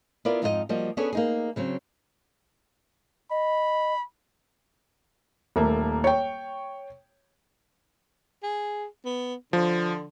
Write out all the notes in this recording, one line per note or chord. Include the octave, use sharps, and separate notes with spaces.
B3 E4 F4 A#4 D5
F2 G#2 D#4 F4 G#4 D#5
F3 G3 A#3 F#4 D#5
B3 C#4 D4 G#4 A4 C#5
A#3 D#4 G#4
C#3 F#3 C4
D#5 B5
D#1 A3 A#3
C#5 G5
G#4
B3
D3 F3